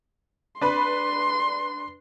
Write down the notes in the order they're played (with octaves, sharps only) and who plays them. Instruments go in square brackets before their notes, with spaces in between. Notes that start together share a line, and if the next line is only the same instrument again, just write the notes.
[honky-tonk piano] D4 B4 B5 [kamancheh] C6